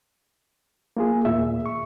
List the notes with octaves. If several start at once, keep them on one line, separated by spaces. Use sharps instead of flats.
A#3 F4 G#4
D#2 A#2 E5
C#6